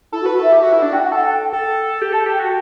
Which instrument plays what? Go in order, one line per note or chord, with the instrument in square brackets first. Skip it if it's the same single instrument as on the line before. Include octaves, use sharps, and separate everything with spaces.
[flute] E4 [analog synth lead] A4
[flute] F#4
[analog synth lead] B4
[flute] F#4
[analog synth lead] A4 [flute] E5
[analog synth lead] G4
F#4
E4
D4
[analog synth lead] F#4 [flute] G5
[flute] F#5
[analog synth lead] A4
[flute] G5
G5
[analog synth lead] A4
G4
[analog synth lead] A4 [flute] A5
[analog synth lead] G4
[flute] G5
[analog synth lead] F#4